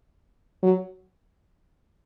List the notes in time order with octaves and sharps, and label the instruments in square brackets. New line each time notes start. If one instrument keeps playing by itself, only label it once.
[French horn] F#3